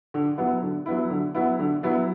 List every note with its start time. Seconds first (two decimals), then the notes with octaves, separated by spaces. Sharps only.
0.14 D3
0.37 F#3 B3 E4
0.63 D3
0.86 F#3 B3 E4
1.10 D3
1.35 F#3 B3 E4
1.59 D3
1.83 F#3 B3 E4